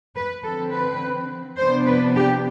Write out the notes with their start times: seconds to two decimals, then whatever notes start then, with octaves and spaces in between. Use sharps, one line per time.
0.15 B4
0.43 D3 F3 C4 A4
0.71 B4
1.57 C3 F3 B3 D4 C5
1.85 B4
2.15 G4